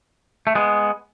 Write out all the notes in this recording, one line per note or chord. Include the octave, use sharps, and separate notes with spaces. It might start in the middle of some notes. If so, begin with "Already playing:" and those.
A3
G#3 B3